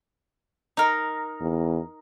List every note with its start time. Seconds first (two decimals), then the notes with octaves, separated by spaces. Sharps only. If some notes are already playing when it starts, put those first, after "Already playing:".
0.77 D#4 A#4
1.41 E2